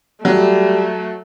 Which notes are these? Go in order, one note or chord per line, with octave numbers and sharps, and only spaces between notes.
F#3 G3 A3